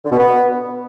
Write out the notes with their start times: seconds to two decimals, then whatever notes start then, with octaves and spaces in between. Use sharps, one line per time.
0.04 D3
0.11 B2
0.18 B3